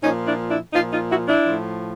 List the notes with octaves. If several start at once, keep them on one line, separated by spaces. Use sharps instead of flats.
A#2 F3 C#4 D#4
D4 E4
D4 E4
A#2 F3 D#4 F4
D#4 F4
E4 F#4
D4 E4
A2 F3